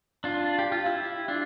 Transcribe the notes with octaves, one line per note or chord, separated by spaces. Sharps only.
D4 F4
G4
F4
E4 G4
D4 F4